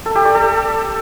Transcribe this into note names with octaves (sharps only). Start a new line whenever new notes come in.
A4
G4
D5
A4